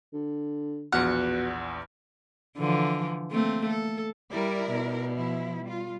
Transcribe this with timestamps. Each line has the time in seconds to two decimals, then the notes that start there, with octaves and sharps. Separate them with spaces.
0.13 D3
0.92 A#1 E2 B2 F#5 F6
2.58 D3 E3 F3
3.32 A3 A#3 C4
3.70 A4
4.32 G3 E4 A#4 D5
4.70 B2
5.15 F3 E4
5.65 G3 F4